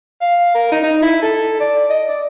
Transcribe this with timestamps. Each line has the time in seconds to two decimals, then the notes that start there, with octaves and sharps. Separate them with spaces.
0.21 F5
0.55 A#4
0.72 D#4
0.83 D#4
1.02 E4
1.22 A4
1.60 D5
1.90 D#5
2.08 D5